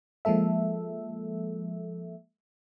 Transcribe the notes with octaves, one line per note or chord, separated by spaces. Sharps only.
F3 G#3 A#3 A4 E5